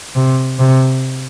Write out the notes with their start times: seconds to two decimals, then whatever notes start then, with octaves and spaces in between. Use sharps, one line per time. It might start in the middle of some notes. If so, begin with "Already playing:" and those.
0.16 C3
0.59 C3